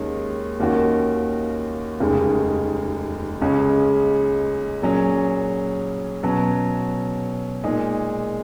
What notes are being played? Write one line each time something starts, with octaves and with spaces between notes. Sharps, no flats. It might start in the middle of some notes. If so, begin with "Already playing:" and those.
Already playing: D#2 D#3 G#3 C#4
D#2 D#3 A#3 C#4 F#4
F1 D#2 C#3 G#3
C#2 C#3 G#3 C#4
A#2 F#3 C#4 G#4
B2 F#3 C#4
A#2 G#3 D#4 G#4